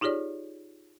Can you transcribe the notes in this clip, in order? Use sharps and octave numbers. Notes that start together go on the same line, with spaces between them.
D#4 F4 G4 G#4 C#5 D5